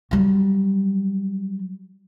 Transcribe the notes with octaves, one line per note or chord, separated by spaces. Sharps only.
F#3 G3